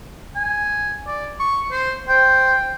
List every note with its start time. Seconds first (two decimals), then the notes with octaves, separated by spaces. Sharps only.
0.36 G#5
1.07 D5
1.40 C#6
1.71 C5
2.08 C5 G5